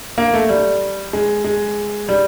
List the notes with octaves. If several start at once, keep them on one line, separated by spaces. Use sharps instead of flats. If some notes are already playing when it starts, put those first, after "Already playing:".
A#3
A3
G3
G#3
G#3
G3